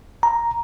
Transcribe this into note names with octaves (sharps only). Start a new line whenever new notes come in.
A#5